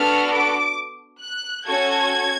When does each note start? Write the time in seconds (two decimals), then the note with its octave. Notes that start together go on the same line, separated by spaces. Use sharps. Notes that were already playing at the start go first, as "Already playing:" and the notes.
Already playing: B3 D4 F#4 A4 F6
0.33 D6
1.21 F#6
1.66 C#4 F#4 A4 G#6